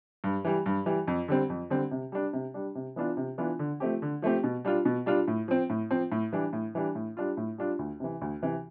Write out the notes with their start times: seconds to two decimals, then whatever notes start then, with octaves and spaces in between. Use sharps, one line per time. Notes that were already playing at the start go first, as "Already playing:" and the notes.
0.24 G2
0.45 E3 G3
0.66 G2
0.86 E3 G3
1.07 F2
1.28 D3 G3 C4
1.50 F2
1.70 D3 G3 C4
1.91 C3
2.12 G3 D4
2.33 C3
2.54 G3 D4
2.75 C3
2.96 E3 B3 D4 F4
3.17 C3
3.38 E3 B3 D4 F4
3.59 D3
3.80 F3 A3 C4 G4
4.02 D3
4.22 F3 A3 C4 G4
4.44 B2
4.65 G3 D4 F4
4.85 B2
5.06 G3 D4 F4
5.28 A2
5.48 F3 C4
5.70 A2
5.91 F3 C4
6.12 A2
6.32 E3 G3 D4
6.53 A2
6.75 E3 G3 D4
6.95 A2
7.17 G3 D4 F4
7.37 A2
7.58 G3 D4 F4
7.79 D2
8.00 C3 E3
8.22 D2
8.42 C3 E3